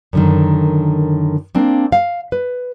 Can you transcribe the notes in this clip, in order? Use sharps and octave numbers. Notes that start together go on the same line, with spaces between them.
F#2 D3 D#3
A#3 C4 D4
F5
B4